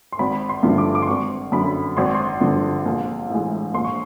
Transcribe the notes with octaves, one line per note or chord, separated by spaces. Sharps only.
C6
G#1 B5
C6
G2 D3 F3 A3
D6
D6
C6
G#1 C#6
F#2 D3 B5
G#1 C6
C#6
C6
G2 D3 F3
A#1
A2 E3 G#3
A#1 C6
C#6